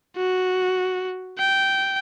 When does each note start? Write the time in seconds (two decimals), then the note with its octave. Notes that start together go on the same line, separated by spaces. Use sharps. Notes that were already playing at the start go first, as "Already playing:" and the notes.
0.17 F#4
1.39 G5